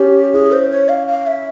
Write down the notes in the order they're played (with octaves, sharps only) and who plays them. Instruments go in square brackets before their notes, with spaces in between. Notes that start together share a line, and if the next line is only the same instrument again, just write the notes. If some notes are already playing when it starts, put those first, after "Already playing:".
Already playing: [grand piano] C#4 [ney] G4
[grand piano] E4 [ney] G#4
[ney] C5
C#5
F5
F5
E5